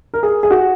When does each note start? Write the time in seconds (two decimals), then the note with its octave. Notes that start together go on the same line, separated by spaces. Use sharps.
0.14 A#4
0.23 G#4
0.43 G#4
0.51 F#4